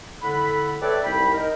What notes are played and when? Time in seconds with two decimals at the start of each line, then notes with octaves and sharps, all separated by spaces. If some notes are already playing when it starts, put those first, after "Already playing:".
0.22 A2 D3 A4 F#5 B5
0.81 A4 B4 C#5 D5 E5 G5
1.04 C2 D#4 G5 B5
1.33 D#4 A#4